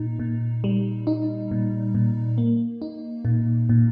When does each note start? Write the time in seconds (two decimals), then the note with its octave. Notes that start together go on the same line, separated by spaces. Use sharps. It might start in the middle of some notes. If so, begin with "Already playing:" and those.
Already playing: A#2 D#4
0.19 A#2
0.64 G3
1.07 D#4
1.51 A#2
1.95 A#2
2.38 A#3
2.82 D#4
3.25 A#2
3.69 A#2